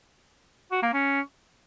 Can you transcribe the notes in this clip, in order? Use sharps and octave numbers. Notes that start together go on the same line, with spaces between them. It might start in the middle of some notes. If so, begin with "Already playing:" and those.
F#4
A#3
C#4